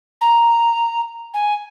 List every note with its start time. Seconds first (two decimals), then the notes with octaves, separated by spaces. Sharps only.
0.21 A#5
1.34 G#5